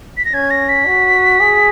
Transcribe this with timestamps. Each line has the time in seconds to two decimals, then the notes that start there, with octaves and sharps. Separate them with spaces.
0.17 B6
0.25 A#6
0.33 C#4 G#6
0.50 A#6
0.69 B6
0.86 F#4
1.40 G#4